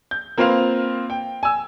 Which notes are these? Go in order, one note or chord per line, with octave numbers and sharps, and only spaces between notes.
G6
A#3 C4 F4 B4 C5 F5
G5
G#5 E6